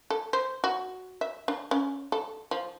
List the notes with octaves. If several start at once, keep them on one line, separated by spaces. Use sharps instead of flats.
A4
C5
F#4
E5
D4
C#4
A4
F3